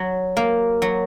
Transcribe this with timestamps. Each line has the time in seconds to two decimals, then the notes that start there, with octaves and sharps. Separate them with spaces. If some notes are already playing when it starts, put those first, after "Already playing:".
Already playing: F#3
0.37 A#3
0.82 F#3